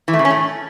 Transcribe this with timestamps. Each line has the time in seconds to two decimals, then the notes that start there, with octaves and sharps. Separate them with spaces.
0.08 E3
0.13 A3
0.19 C#3
0.25 C#4
0.30 A2